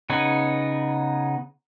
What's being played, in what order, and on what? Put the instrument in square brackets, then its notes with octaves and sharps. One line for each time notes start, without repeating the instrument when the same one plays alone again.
[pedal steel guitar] C#3 B3 D#4 B4 C#5